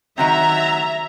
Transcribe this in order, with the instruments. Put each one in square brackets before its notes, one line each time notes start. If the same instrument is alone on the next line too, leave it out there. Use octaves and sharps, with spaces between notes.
[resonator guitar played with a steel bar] D#3 F#3 C4 [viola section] E5 A#5